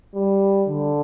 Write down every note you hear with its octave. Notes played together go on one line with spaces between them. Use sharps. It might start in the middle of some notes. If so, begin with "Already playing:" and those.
G3
D3